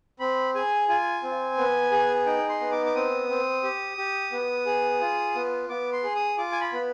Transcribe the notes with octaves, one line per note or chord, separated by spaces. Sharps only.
C4 B5
G#4 G#5
F4 G#5
C4
B3
G#4
D#4 G5
C6
B3
D6
D6
C4 D#6
C4
G4
G4
B3
G#4
F4
B3
B3 D6
C6
G#4
D#6
F4 D6
G#5
B5
B3